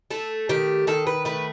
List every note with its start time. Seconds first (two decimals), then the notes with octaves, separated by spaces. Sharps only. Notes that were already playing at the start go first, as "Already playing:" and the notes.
0.11 A3 A4
0.49 D#3 G4
0.87 D#3 A4
1.07 B4
1.25 A3 B4